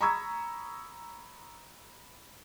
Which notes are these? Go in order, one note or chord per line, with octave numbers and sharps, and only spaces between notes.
A#5 B5 C#6 D#6 E6 G#6